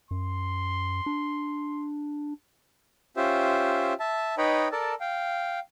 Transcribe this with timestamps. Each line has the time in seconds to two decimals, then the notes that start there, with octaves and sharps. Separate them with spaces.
0.11 F#2 C6
1.06 D4
3.17 C#4 F4 G4 C5 E5
4.00 E5 A5
4.38 D#4 B4 C#5 D#5 G5 B5
4.72 A4 A#4 D5 A5
5.00 F5 G5